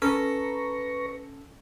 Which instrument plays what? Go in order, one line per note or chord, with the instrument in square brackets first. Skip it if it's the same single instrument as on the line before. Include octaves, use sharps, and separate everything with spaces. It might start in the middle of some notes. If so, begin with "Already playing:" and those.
[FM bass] C#4 [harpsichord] A4 [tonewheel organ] B4 A#5 C#6